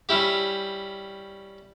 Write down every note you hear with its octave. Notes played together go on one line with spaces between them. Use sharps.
G3 C#4 E4 G4